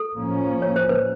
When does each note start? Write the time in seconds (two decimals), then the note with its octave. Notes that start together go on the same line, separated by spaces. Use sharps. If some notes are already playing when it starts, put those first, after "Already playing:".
Already playing: A4
0.15 A2 F3 A#3 C#4
0.62 C#5
0.76 C5
0.89 B4